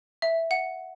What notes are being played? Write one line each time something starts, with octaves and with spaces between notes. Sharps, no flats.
E5
F#5